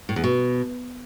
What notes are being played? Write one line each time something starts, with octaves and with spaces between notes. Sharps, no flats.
A2
E2
B2